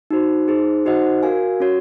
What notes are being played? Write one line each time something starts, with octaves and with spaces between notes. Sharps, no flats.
D#4 F#4 C5
D#4 G#4 C5
D#4 F#4 C5 D#5 F#5
F#4 A#4 F5 G#5
C#4 F#4 C#5